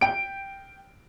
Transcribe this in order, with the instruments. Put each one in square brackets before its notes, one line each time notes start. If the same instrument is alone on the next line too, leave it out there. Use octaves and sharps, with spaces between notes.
[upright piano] G5 D7